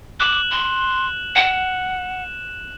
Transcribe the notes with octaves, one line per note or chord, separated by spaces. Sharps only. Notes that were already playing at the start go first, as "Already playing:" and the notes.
D6 F#6 E7 F#7
C6
F#5 E7